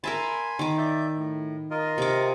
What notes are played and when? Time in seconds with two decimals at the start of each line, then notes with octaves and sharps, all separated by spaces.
0.04 A#4 E5 G#5 A5 B5 C6
0.59 D#3 D6
0.78 D5 E5 G6
1.16 A2
1.71 F4 A#4 D#5
1.98 C3 D6